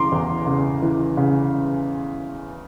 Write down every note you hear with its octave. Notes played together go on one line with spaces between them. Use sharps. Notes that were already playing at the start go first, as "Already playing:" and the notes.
Already playing: C#3 E3 A#5 C6 D6
E2
C#3
E3
C#3